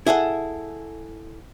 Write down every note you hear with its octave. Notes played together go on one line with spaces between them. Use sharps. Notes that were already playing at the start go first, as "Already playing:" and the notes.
E4 G#4 A4 F#5